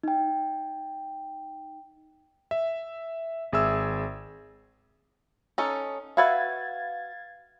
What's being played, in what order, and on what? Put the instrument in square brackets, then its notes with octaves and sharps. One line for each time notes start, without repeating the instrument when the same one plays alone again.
[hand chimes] D#4 G5
[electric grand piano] E5
G#1 G#4 E5 E6
[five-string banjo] C#4 D#4 A4
[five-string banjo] F#4 B4 E5 [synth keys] F5 G#6 A6